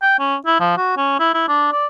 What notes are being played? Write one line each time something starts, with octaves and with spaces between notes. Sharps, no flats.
G5
C#4
E4
F3
F#4
C#4
E4
E4
D4
D5